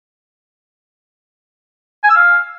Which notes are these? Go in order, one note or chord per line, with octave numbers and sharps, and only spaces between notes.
G#5
E6
F5